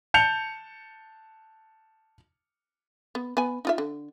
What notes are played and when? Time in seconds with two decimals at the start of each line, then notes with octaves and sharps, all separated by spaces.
0.14 A5 G6 C#7 F7
3.15 B3
3.37 B3 B4 G#5
3.65 D#4 F4 E5
3.78 D3